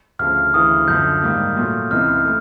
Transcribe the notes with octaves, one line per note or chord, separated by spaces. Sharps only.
D2 C#3 F3 F6
D2 C#3 E3 D#6
F#2 D3 F3 G6
G#2 D#3 G3 A#3
A#2 F#3 A3
C#2 C3 E3 F6
A3